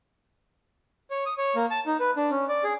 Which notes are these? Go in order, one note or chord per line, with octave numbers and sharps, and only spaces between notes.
C#5
D#6
C#5
A#3
A5
D#4
B4
D4
C#4
D5
G#4